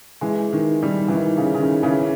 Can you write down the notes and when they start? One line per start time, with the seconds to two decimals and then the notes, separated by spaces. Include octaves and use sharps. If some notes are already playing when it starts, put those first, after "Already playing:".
0.21 E3 G#3
0.53 D#3
0.82 D#3 G3
1.08 E3
1.13 D#3
1.37 C#3
1.54 C#3
1.60 D#3
1.83 C#3 E3